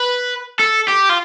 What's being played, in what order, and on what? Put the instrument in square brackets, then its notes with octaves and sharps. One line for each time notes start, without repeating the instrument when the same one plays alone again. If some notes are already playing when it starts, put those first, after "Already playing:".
Already playing: [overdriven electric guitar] B4
A4
G4
F4